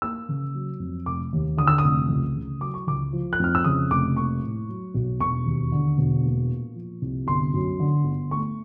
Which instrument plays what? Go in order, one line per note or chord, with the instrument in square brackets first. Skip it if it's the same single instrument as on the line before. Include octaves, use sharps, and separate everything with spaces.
[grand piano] A#3 E6
C#3
F#3
F2
F1 D6
D#2
D3 D#6
E6
D#6
F1
C#2
C#3
F#3 D6
C#6
C#2 D6
F3
F#6
F2 F6
E6
C#3 D#6
F1 D6
A#3 C#6
A2
F#3
B1
E1 C#6
D#2
D3
E1
A#3
A#2
F3
C2
G1 C6
F#2
D3
G1
A3 C#6